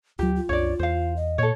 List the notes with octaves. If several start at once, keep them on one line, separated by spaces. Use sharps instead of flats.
D2 F#3 F4 G4
F4
C2 F#2 D4 C#5 D5
E2 C5 F5
D#5
A#2 A4 C#5